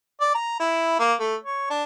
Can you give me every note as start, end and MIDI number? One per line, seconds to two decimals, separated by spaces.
0.21 0.33 74
0.35 0.56 82
0.60 0.99 64
0.99 1.13 58
1.20 1.35 57
1.43 1.66 73
1.70 1.84 62